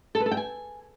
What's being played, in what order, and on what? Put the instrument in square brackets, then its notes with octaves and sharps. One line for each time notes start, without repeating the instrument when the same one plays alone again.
[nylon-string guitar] A4
B4
A4
G5
G#5